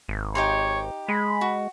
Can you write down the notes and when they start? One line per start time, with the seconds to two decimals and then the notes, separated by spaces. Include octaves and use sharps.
0.09 G#1
0.35 D#4 G4 C#5 C6
1.08 G#3 B5
1.41 F#4